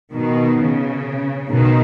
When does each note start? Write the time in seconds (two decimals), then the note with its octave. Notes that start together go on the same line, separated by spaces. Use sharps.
0.14 B2 D#3
0.59 C#3
1.49 B2 D#3